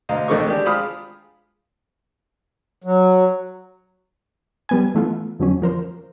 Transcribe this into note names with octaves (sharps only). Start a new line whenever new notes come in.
D2 D#5 F5 A#5
A1 D#3 A3 A4 D#5 C#6
G#3 D4 G4
G#3 F4 B5 D#6 F6
F#3
G3 B3 G#5
E3 A3 B3 F4
F2 D3 F#3 C#4
F3 A#4 C5